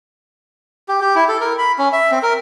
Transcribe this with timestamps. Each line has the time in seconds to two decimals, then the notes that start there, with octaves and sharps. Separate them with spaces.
0.88 G4
1.01 G4
1.16 E4
1.29 A4
1.41 A#4
1.58 B5
1.78 C#4
1.93 E5
2.11 C4
2.23 A#4